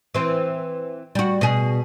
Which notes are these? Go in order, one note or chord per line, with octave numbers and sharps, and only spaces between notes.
E3 C4
G3 F#4
B2 G#4